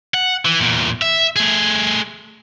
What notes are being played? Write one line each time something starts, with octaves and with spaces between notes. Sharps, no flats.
F#5
E3
E2 A#2
E5
A3 G#4